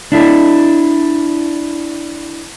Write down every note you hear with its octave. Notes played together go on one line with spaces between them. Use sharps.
D4 E4 A4